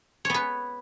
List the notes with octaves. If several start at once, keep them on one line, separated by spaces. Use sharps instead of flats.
B3 B4 C#5